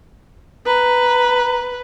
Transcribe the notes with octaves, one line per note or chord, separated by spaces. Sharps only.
B4 A#5